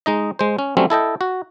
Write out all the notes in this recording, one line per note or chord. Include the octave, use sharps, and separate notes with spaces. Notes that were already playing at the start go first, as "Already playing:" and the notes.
G#3 D#4 D#5
G#3 C5
C#4
F#3 G3 A3 C4 C#4
E4 A4 D#5 G5
F#4